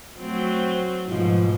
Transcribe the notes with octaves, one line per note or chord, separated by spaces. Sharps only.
F#3 A3 C4
G#2 B2 F3